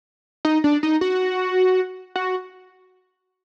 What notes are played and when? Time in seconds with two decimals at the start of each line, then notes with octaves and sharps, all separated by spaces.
0.45 D#4
0.64 D4
0.83 D#4
1.01 F#4
2.15 F#4